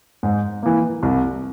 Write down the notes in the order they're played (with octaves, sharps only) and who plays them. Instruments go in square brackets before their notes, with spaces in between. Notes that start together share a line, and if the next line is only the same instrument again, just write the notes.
[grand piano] G#2
E3 A#3
C2